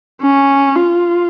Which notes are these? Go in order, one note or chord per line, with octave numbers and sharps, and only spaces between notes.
C#4
F4